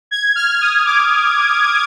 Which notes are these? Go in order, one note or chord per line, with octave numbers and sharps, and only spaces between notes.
G#6
F6
F6
D#6
D6